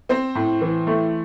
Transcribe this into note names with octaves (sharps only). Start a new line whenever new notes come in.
C4 C5
A2
E3
A3